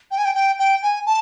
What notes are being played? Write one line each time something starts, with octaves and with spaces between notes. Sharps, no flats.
G5
G#5
G5
G5
G5
G#5
A5